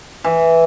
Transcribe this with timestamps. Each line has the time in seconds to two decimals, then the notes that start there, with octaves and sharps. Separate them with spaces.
0.24 E3